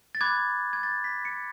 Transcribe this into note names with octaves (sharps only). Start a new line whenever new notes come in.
A6
B5 D6 F#6 G#6
G#6
A6
B6
C#7